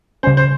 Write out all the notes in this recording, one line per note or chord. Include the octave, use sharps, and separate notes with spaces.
C#3 G3 C#4 C5
C5